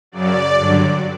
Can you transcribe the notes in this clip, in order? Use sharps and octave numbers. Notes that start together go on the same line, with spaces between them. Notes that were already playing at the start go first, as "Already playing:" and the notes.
F#2 C#3 F#3 D5
G2 D3 F#3